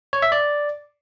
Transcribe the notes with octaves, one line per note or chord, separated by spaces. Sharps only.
C#5
E5
D5